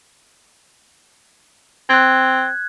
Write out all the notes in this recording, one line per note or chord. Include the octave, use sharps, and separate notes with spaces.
C4 F#6 G#6